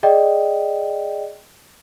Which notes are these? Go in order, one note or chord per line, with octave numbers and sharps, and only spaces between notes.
G#4 D5 D#5 G5